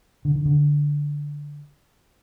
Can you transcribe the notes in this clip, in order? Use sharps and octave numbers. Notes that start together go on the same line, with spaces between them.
D3
D#3
D3